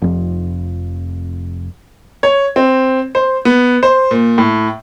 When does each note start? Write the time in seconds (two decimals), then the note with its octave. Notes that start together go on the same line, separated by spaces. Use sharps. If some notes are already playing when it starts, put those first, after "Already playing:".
0.02 F1 F2
2.23 C#5
2.56 C4
3.15 C5
3.45 B3
3.83 C5
4.11 A#2
4.38 A2